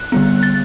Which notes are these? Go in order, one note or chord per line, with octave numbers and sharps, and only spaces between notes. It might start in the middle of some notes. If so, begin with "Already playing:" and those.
Already playing: F#6
D3 G3 B3
A6